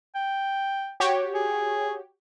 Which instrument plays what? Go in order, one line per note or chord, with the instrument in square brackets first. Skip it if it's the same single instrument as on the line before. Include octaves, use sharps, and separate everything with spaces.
[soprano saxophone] G5
[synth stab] F#4 G4 C#5
[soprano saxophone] G#4